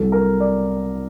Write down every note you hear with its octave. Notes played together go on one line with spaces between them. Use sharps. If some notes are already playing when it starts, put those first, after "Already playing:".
Already playing: C2 C3 F#3 A4
A#4
D5